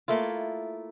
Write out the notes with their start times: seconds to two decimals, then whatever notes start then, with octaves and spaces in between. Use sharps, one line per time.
0.08 A3 A#3 E4 F4